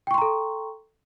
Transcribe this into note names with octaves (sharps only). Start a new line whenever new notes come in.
A4 G5 A#5 C6 C#6